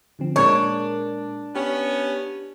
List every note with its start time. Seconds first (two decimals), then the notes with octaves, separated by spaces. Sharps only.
0.19 D3 F3 C4
0.36 A#2 G#3 D4 A#4 C#5
1.55 B3 C#4 G4